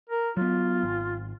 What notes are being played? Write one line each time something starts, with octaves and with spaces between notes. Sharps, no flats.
A#4
F#3 B3 F4
G#1